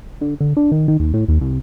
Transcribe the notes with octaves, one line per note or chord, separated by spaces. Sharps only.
D3
D3
D4
D#3
D#3
D#2
A2
D#2
C2